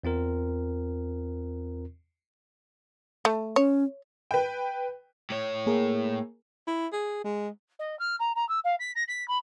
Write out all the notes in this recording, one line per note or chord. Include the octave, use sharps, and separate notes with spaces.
E2 C4 F4 A#4
A3
C#4 C#5
B4 G5
A2 C#5
A#3 G#4 A#4
E4
G#4
G#3
D#5
F6
A#5
A#5
E6
F5
B6
A#6
B6
B5